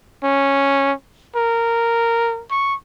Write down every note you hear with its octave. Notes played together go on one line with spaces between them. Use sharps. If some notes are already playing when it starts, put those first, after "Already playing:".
C#4
A#4
C#6